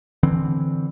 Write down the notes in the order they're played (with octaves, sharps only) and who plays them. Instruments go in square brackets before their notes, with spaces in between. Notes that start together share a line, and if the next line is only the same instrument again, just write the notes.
[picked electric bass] D3 E3 C4